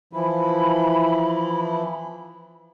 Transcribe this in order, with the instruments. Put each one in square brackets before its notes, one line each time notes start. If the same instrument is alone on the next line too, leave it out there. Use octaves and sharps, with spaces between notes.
[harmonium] E3 F3 E4 [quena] B5